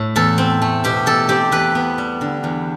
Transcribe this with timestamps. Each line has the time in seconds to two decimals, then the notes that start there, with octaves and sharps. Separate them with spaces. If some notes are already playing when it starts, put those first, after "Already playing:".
Already playing: A2 A3
0.16 E2 A4
0.38 C4
0.62 A3
0.84 B2 G4
1.06 E2 A4
1.29 C4 G4
1.52 E2 B4
1.75 B3
1.98 G3
2.21 D3
2.44 E2